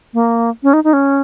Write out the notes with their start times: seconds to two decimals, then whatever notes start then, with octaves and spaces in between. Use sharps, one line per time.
0.14 A#3
0.63 C#4
0.73 D#4
0.84 D#4
0.93 C#4